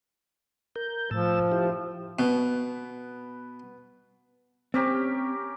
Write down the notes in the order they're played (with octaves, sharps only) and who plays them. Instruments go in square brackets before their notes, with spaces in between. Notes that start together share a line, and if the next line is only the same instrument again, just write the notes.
[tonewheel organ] A#4 G6
[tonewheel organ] A2 A5 E6 [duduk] F3
[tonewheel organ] E4 G4
[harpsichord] B2 [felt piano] B3
[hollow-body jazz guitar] C4 [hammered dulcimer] C#4 G4 A#4